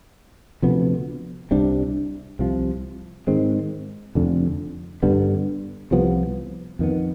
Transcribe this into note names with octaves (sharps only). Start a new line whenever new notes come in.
D2 C3 F3 B3
C2 C3 G3 D4
C2 C3 F3
G#2 D#3 G#3 C4
F1 F2 D3
G2 D3 G3 B3
C2 C3 F3 B3
F2 D#3 B3